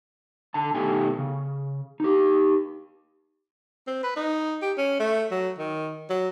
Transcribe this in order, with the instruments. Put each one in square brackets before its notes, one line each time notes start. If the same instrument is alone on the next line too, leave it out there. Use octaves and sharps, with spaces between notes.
[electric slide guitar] D3 A5
B2 D#3 A3 G4 G#5
C#3
D#4 G4
[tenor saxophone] C4
B4
D#4
G4
C#4
A3
F#3
D#3
F#3